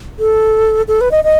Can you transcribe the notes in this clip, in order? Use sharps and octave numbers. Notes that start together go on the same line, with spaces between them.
A4
A4
B4
D#5
D#5